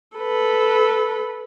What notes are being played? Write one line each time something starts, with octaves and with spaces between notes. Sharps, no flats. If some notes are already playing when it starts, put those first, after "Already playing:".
A4 B4